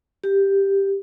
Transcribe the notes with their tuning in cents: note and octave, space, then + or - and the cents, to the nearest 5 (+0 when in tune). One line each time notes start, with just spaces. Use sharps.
G4 +5